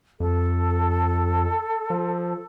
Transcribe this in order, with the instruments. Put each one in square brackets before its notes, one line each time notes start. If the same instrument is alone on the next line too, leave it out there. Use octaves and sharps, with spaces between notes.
[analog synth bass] F2 [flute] A4
[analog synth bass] F3